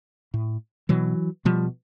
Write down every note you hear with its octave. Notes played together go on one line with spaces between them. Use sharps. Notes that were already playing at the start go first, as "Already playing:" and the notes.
A2
B2 E3 F#3
B2 F3 G3